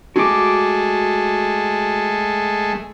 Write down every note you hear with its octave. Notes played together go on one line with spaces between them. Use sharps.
G#3 A3 F#4 D6